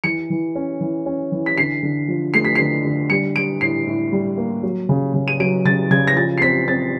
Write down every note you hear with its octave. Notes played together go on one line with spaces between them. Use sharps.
E3 C#7
E3
C#4
E3
C#4
E3
B6
D3 C7
D3
F3
A3 C7
B6
D3 C7
D3
G3 C#7
G3 D7
A2 C7
A2
G3
A#3
F#3
C#3
C#3
D#7
F#3 D7
C#3 A6
C#3 G#6
A#6
F3 A6
C7
C4 B6
C4 A6